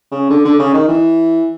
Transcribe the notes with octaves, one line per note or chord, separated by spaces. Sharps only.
C#3
D3
D3
C#3
D#3
E3